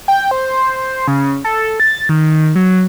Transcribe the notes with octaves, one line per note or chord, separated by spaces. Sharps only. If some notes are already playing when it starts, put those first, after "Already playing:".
G5
C5
C#3
A4
A6
D#3
F#3